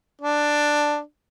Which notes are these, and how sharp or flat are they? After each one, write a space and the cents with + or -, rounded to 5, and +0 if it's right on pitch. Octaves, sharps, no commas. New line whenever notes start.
D4 +5